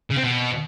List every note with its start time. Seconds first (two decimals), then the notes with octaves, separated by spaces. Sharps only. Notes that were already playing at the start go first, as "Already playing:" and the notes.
0.11 C#3
0.17 C4
0.24 B2